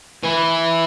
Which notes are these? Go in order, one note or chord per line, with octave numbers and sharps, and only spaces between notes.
E3